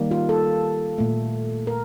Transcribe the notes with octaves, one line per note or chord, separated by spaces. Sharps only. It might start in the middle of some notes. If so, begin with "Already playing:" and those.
Already playing: D#3 G3 A#3
F4
A4
A#2 A3
A#4